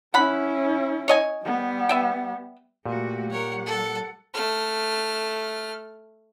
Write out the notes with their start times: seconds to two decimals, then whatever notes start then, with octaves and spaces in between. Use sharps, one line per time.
0.14 C#4 E4 F#5 B5
1.08 C#5 D#5 G#5
1.44 G3 B3
1.89 B4 E5 G5
2.86 A#2 A3 F#4 G4
3.30 G3 A#4 C#5 F#5
3.66 A4
4.34 A3 F6